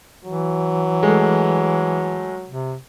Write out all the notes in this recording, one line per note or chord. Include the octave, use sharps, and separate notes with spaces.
E3 F#3
G#3 A3
C3